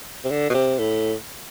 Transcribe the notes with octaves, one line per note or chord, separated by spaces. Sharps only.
C3
D3
B2
C3
A2